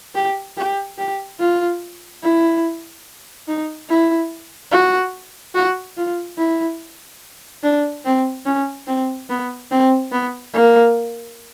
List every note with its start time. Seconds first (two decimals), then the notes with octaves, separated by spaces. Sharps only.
0.15 G4
0.57 G4
0.98 G4
1.39 F4
2.22 E4
3.47 D#4
3.89 E4
4.72 F#4
5.54 F#4
5.97 F4
6.38 E4
7.63 D4
8.05 C4
8.46 C#4
8.87 C4
9.29 B3
9.71 C4
10.12 B3
10.54 A#3